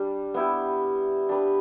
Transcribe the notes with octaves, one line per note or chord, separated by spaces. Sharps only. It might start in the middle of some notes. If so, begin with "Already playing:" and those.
Already playing: G3 D4 G4
B3 E4 G4
D4 G4 B4